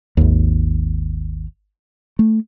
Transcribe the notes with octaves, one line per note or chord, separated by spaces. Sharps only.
G#1 D#2
A3